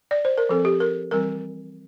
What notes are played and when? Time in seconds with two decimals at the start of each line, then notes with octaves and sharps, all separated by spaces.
0.11 D5
0.25 C5
0.38 A#4
0.49 F3 C4 A4
0.65 G4
0.80 A#4
1.11 E3 G3 C4 A#4